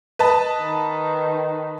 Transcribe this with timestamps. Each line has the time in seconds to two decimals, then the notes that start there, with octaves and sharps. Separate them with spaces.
0.19 B4 D#5 A5
0.61 D#3